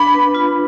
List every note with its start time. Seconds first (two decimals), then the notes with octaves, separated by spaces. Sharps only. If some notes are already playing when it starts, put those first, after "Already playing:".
Already playing: D4 B5
0.14 B4
0.35 F4